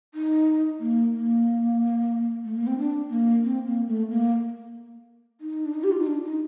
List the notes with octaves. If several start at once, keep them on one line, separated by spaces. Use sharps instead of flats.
D#4
A#3
A#3
A3
A#3
C4
D4
A#3
C4
A#3
A3
A#3
D#4
D4
D#4
G4
F4
D#4
D4
D#4